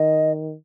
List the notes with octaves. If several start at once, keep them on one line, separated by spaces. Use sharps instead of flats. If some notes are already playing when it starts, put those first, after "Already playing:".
Already playing: D#3 D#5